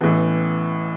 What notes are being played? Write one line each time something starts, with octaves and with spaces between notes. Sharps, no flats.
A1 A2 E3 B3